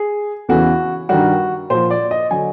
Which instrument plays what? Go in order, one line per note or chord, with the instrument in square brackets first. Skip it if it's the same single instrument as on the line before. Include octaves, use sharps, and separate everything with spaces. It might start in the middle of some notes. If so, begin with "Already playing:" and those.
Already playing: [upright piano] G#4
E2 C#3 E3 F#4
G2 D#3 G3 F#4
A#2 F3 C5
D5
D#5
D3 F#3 G#5